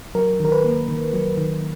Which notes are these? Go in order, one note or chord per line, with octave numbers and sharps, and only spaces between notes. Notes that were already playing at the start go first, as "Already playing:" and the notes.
F#3 A#4
D#3 A#4
B4
A#3
D#3
F#3
D#3